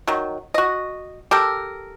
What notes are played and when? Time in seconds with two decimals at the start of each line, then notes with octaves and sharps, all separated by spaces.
0.08 D#3 F#3
0.54 F#4 D#5
1.31 G4 A4 A#4